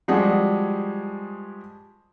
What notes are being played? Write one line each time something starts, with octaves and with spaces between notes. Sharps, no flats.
F3 G3 G#3 F#4 G#4